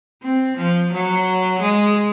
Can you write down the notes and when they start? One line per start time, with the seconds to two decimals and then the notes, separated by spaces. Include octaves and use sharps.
0.23 C4
0.58 F3
0.93 F#3
1.61 G#3